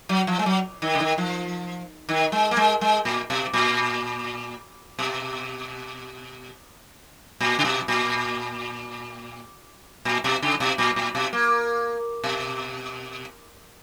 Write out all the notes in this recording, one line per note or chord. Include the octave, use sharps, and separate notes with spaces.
F#3
F3
G#3
F#3
D#3
C#3
D#3
F3
D#3
G#3
A#3
G#3
G#3
A#2
B2
A#2
B2
A#2
C#3
B2
A#2
A#2
B2
C#3
B2
A#2
A#2
B2
A#3
B2